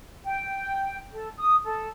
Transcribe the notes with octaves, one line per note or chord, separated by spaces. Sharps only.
G5
A4
D#6
A4